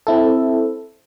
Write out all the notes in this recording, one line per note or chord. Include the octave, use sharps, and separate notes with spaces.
C4 E4 A4